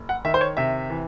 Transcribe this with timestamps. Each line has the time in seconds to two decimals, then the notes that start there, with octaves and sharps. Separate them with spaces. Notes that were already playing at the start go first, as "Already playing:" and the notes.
Already playing: F#1
0.09 F#5
0.25 D#3 E5
0.34 C5
0.41 C#5
0.57 C3 E5
0.90 E3